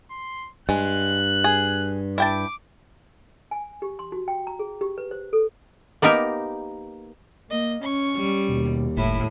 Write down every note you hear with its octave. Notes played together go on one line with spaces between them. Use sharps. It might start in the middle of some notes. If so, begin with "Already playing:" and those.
C6
G2 G#3 F#6
G#4
E4 G5 A5 D6
G#5
G4
C6
F#4
G5
A#5
G#4
G4
B4
C5
A4
A#3 B3 D#4 G4 A#4
A#3 D#5
C#4 C#6
G3
D#2 B2
F#1 A2 E4